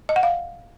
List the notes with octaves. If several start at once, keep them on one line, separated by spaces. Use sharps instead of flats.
D#5
F#5
F5